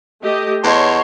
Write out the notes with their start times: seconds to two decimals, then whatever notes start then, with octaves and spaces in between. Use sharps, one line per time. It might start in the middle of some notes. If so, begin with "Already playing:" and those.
0.22 A3 G4 D#5
0.64 E2 C#5 D#5 F#5 A5 C6